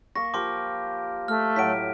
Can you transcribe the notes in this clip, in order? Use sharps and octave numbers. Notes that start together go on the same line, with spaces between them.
A#3 C#6 A#6
F3 G4 A#4 C6 D6
A3 F6
A2 F#3 B6 D7